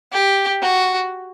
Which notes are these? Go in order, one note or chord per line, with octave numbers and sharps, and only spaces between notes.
G4
F#4